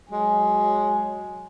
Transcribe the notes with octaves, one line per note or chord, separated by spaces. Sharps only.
F#3 G#3 G#5